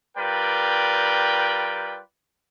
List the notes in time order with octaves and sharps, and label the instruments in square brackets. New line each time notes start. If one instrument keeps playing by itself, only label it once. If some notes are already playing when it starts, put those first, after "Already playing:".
[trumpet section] G3 F4 A#4 B4 D5 G5